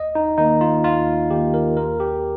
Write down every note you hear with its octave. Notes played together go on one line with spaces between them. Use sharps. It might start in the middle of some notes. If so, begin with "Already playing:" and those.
Already playing: D#2 D#5
D#4
D#3 A#3 D#4
F4
D#2 F4
D#3 A#3 G4
A#4
D#2 A#4
G4